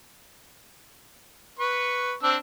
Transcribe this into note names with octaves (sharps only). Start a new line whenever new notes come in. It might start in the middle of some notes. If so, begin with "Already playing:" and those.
B4 C#6
C4 D4 E6